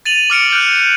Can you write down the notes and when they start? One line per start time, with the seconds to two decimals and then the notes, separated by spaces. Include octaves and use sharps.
0.05 A6 D#7 F7 F#7
0.30 D6 F6 C#7 D7
0.52 F#6 G6